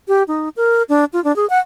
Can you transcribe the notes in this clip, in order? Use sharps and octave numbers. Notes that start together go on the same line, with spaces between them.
G4
D#4
A#4
D4
F4
D4
G#4
F#5